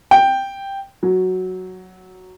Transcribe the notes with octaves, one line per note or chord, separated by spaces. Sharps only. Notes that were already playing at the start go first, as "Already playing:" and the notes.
G5
F#3